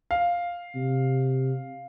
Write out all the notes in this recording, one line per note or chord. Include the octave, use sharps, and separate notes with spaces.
F5
C3